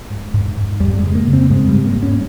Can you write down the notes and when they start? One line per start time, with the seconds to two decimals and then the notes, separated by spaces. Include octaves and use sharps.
0.10 G#2
0.34 G#2
0.57 G#2
0.80 F2 G3
0.98 C#3 G#3
1.15 A#3
1.27 C#3
1.33 C4
1.50 G#2 G#3
1.69 G3
1.74 G#2
1.86 A#3
1.97 G#2
2.02 C#4